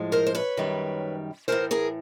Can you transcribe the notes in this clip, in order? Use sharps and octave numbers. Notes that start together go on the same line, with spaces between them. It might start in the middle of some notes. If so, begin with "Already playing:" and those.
Already playing: A2 F3 G#3
A#4 C5
C5
B4 C#5
F#2 D#3 G3
A2 E3 G#3 A#4 C5
G#4 A#4